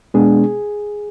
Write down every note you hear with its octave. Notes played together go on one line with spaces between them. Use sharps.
B2 G#3 B3 D4 G#4